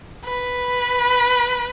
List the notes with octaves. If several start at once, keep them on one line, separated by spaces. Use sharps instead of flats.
B4